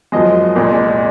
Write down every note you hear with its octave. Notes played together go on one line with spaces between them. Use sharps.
F#2 F3 G#3 D#5
C2 A#2 G#3